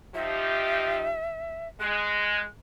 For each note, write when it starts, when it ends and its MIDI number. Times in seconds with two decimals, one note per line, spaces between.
0.14 1.16 53
0.14 1.16 63
0.14 1.16 67
0.14 1.68 76
1.80 2.43 56
1.80 2.46 90